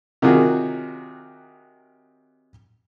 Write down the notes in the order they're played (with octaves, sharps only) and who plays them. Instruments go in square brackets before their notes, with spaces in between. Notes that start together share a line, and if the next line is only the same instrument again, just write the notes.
[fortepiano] C3 D#3 F#3 F4 F#4 G#4